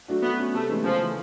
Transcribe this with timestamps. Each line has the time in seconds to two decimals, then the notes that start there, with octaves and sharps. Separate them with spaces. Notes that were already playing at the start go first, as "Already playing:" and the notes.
0.08 F#3 A3 D4 F#4
0.23 A3 B3
0.38 C#4 F#4
0.54 C3 A3
0.70 E3 G#3 C#4
0.85 C#3 F3
1.01 E3 A3